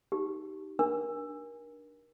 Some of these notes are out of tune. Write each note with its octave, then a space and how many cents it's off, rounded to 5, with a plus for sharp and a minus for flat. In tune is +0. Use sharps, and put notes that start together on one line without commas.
D#4 +5 G4 -20
D4 +0 A#4 +30